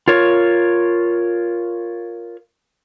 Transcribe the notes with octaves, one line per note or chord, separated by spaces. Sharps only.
F4 A#4 C#5